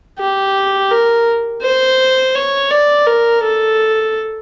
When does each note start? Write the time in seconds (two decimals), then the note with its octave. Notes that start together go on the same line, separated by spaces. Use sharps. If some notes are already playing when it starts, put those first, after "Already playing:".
0.19 G4
0.91 A#4
1.62 C5
2.35 C#5
2.71 D5
3.07 A#4
3.43 A4